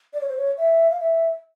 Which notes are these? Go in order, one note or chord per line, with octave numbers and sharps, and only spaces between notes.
D5
C#5
C5
C#5
E5
F5
E5